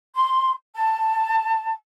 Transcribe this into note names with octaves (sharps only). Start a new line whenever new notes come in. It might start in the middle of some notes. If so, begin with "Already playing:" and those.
C6
A5